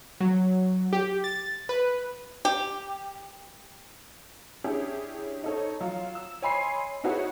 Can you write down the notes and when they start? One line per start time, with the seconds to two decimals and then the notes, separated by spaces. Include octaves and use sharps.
0.21 F#3
0.93 G4
1.24 A6
1.69 B4
2.45 G4
4.64 C#4 D4 E4 G4 G#4 C#5
5.44 D#4 A4 C#5
5.81 F#3 F4
6.15 E6
6.42 C#5 D#5 G#5 B5 C6 C7
7.04 D#4 E4 F#4 G#4 B4 C#5